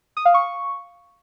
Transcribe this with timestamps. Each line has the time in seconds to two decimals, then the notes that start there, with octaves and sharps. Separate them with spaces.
0.17 D#6
0.25 F5
0.34 C#6